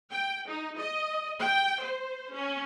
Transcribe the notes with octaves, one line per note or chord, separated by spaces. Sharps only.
G5
D#4
D#5
G5
C5
C#4